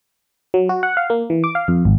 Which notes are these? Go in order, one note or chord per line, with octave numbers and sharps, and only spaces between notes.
F#3
F#4
F#5
F5
A#3
E3
D6
F5
F2
G#1